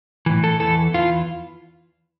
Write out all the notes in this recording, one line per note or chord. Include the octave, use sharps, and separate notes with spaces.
A2 E3
A4
E2 E3 A4
E2 E3 F4